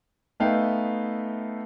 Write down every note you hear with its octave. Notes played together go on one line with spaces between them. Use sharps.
A3 B3 D#4 E5 F5 G5